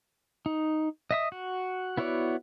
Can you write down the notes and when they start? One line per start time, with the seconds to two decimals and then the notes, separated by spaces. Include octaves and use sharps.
0.46 D#4
1.11 D#5 E5 D#6
1.32 F#4
1.97 B3 E4 F#4 C#5 D5